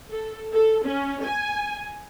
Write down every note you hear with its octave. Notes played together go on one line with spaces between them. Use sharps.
A4
A4
C#4
G#5